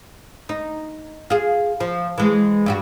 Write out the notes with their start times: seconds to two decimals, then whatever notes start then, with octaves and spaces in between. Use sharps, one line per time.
0.49 D#4
1.30 F4 G#4
1.80 F3
2.18 E3 G#3
2.66 G2 G3 F#4